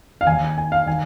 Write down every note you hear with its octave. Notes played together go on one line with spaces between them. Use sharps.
F5
D#2 D#3 G#5
G#5
F5
D#3 G#5